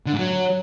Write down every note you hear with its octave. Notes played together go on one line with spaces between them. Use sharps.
D3
G#2
F#3